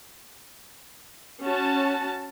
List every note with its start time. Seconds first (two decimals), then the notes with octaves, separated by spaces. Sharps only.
1.43 C#4 F#4 A5